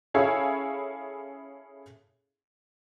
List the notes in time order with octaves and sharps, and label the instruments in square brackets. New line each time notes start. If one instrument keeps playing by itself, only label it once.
[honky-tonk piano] C#4 E4 G#4 A4 C#5 F5